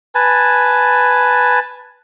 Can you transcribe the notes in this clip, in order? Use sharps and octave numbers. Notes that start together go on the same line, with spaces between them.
B4 G#5 A5